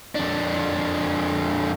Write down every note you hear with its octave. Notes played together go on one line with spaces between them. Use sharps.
F2 D4